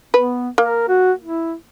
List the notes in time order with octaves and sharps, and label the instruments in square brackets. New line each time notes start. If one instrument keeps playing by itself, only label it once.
[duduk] B3 [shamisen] B4
[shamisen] A#3 [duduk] A#4
[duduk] F#4
E4